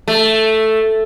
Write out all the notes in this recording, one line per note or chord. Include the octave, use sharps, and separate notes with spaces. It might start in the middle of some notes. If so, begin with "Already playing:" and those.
A3